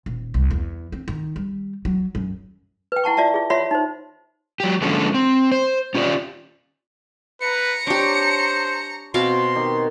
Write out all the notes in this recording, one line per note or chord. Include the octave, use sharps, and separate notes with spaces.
D#1
C2
E2
C4
D#3
G3
F#3
F#2
B4 G5
E4 F#5 A5 C#6
F4 D5 E5 A5
F4 G#4
F4 C#5 E5 F#5 B5 C6
D#4 C5
F#3 G4
D3 F3 G#3 A#3 C#4 A4
C4
C5
C#4 F4 G4 C#5 D5
B4 A#5 C#7
D4 G4 C5 C#5 A5
B2 C4 F5 C6
D#3 D#4 G4